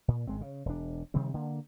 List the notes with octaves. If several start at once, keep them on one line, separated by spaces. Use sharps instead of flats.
A#2
G#1 G#3 C4
C#3
E1 D4
C3 D#3 G3 C4
D3 A#3